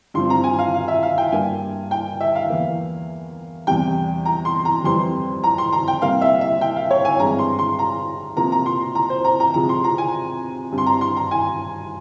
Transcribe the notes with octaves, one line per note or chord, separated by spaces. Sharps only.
G2 F3 C4 C6
A#5
G#5
F5
F5
E5
F5
G5
G2 G3 A#3 G#5
G5
E5
F5
E2 E3 A#3
E2 C3 G3 G5
A#5
C6
A#5
F2 E3 G3 C4 C6
A#5
C6
A#5
G5
C3 G3 A#3 F5
E5
E5
G5
F5
C#5
G#5
G2 E3 G#3 C4 A#5
C6
C6
A#5
C3 F3 A#3 A#5
A#5
C6
A#5
C5
A#5
A#5
C3 F3 G#3 C4 A#5
C6
A#5
G#5
G2 G3 C4
C6
A#5
C6
A#5
G#5